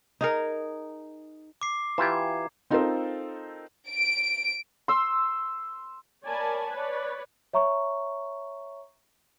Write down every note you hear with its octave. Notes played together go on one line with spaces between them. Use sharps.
D#4 G#4 A#4
D6 C7
E3 F4 G4 A#5 G#6
C4 D#4 F4 A4 A#4 C5
D7
C6 E6
A#4 C#5 D5 G#5 A5 B5
B4 C#5 D5
C#5 E5 A#5 C#6